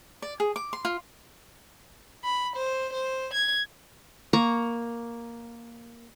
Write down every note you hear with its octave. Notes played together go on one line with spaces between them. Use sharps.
D5
G#4
D6
C6
F4
B5
C5
C5
G#6
A#3 A#5 C#6